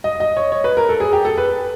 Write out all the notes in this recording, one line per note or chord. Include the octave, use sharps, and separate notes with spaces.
D#5
D#5
C#5
C#5
B4
A#4
A4
G#4
G4
A4
B4